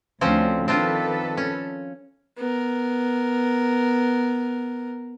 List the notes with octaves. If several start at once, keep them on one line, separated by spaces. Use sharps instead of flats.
D2 D3 F3 C4 C#4
D#3 C4 D4 F4 A4 B4
C#4
B3 A#4